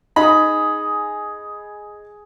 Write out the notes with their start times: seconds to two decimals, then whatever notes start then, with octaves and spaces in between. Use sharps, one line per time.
0.16 D#4 G#4 B5